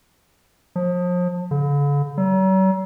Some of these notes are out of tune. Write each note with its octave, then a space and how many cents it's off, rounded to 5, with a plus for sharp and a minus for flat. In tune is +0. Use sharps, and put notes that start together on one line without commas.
F3 +35
D3 -45
F#3 +45